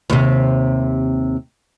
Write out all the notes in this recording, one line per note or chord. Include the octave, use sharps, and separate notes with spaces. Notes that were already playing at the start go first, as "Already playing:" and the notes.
D#2 C3